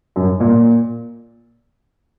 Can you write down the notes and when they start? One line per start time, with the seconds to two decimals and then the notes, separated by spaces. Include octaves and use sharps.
0.16 F#2
0.40 A#2